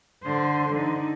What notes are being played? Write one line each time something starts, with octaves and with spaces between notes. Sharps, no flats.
D3 C5
D3 D#4